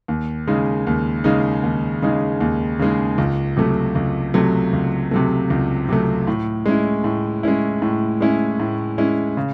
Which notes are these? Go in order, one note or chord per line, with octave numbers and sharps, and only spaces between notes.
D#2
C#3 G#3 D#4
D#2
C#3 G#3 D#4
D#2
C#3 G#3 D#4
D#2
C#3 G#3 D#4
C#2
C3 F#3 A3
C#2
C3 F#3 A3
C#2
C3 F#3 A3
C#2
C3 F#3 A3
A2
G#3 C#4 E4
A2
G#3 C#4 E4
A2
G#3 C#4 E4
A2
G#3 C#4 E4
C#3